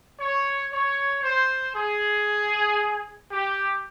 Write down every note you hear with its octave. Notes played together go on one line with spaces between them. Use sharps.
C#5
C#5
C5
G#4
G4